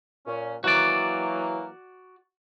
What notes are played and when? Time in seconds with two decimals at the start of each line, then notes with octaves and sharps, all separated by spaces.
0.27 A#2 C#4
0.64 E3 F#3 A#3 F#4 D5